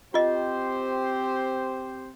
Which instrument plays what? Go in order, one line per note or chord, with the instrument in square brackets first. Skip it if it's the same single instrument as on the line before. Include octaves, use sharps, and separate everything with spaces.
[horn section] C4 G4 C5 [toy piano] F4 D#5